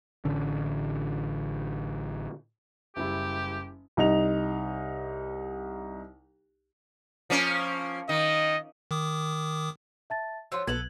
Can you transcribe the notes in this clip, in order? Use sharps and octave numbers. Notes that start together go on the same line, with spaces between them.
A1 D3 C#4
F#1 G3 E4 G4
C2 D#4 F7
F3 A#3 C#4
D#3 D#5
D#3 D6 D#6
E5 A5 A6
F3 F#3 F4 C6 E6
B1 B2 B3 A4 G#6 F#7